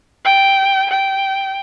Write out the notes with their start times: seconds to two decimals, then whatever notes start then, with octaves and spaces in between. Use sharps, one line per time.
0.25 G5
0.90 G5